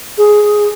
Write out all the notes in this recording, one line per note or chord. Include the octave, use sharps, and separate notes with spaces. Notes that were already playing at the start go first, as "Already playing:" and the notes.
G#4